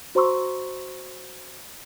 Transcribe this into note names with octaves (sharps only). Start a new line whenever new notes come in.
F#4 C5 A#5 C6 C#6 E6